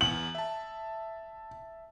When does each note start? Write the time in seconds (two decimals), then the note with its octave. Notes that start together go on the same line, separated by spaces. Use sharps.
0.01 E2 F#7
0.35 E5 A5